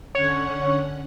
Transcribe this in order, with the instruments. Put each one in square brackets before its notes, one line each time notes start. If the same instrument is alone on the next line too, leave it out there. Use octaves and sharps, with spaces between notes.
[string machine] D3 C#4 F#5 [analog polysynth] C#5